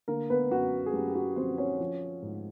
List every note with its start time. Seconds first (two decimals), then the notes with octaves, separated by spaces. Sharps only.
0.08 D3 A#3 A#4
0.30 B3 B4
0.51 F#2 F#4
0.86 G#4
0.93 F#2 G4
1.09 G4
1.15 F#4
1.36 F3 C4 C5
1.58 C#4 C#5
1.80 F3
2.22 G#2